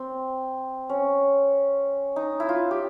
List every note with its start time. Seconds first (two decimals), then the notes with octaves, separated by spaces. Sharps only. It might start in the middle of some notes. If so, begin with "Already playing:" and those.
Already playing: C4
0.89 C#4
2.16 D#4
2.40 E4
2.49 F4
2.71 G4